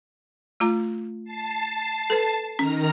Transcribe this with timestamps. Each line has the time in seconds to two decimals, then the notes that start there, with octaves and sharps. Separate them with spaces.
0.60 A3 F4 A#5
1.24 A5 C7
2.10 A4 B4
2.59 D#3 C#4 A#5 F6